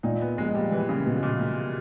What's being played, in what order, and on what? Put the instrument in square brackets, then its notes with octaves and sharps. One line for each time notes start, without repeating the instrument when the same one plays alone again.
[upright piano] A#2 [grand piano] D#4
[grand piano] B3
[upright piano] A#1 [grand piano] G#3
[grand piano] G3
[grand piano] E3 [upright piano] A#3
[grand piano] C#3
[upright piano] A#1 [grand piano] B2
[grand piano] A#2
[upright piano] A#3